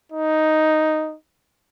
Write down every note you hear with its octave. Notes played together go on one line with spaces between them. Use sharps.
D#4